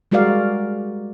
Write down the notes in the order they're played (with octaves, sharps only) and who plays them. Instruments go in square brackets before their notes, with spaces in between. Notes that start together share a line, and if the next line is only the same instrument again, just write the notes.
[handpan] G3 G#3 F#4 A#4 D5 F5